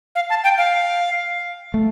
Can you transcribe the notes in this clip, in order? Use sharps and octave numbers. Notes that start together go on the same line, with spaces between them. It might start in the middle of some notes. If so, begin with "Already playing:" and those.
F5
A5
G5
F5
A3